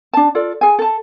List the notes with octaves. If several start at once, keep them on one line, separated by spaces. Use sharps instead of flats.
D4 A5
F4 A4 D5
G#4 G#5
A4 A5